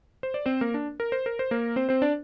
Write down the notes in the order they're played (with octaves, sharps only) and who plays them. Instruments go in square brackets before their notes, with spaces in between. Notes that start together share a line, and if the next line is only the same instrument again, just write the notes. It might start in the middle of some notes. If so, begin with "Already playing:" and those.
[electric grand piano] C5
D5
C4 C5
A#3 A#4
D4
A#4
C5
A#4
C5
A#3 A#4
C4 C5
C4 C5
D4 D5